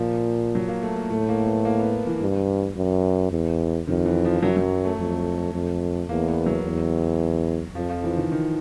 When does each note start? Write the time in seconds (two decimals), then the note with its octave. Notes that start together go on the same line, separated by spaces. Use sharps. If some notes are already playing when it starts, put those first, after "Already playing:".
Already playing: A#2 F3
0.55 F#3
0.68 A#3
0.82 A3
0.96 A#3
1.10 A2 A3
1.29 A#3
1.46 B3
1.65 A#3
1.79 B3
2.07 E3
2.21 G2
2.76 F#2
3.31 E2
3.87 F2 D#3
4.06 E3
4.25 F3
4.43 F#2 F#3
4.57 F#3
4.85 A3
4.99 F2
5.54 F2
6.09 E2 A#3
6.28 B3
6.46 F#3
6.64 E2
7.75 F2 F3
7.89 F3
8.04 E3
8.17 D#3
8.32 D#3